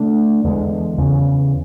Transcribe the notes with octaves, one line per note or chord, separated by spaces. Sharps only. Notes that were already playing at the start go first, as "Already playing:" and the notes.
Already playing: D3 A3 D4
E2 D3 G#3
E2 C#3 E3